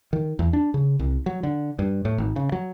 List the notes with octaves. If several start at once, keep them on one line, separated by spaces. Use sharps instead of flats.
D#3
E2
D4
C#3
C2
F#3
D3
G2
A2
G#1
C#3
F#3